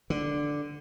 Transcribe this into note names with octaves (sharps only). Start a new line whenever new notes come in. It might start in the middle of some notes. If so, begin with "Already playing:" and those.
D3